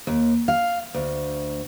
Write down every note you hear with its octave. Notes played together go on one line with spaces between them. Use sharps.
D#2
F5
D2